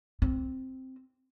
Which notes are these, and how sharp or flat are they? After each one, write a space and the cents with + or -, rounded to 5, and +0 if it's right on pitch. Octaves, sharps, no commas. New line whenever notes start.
C4 -5